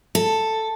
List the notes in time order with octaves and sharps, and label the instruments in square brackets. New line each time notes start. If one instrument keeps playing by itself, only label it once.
[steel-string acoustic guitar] A4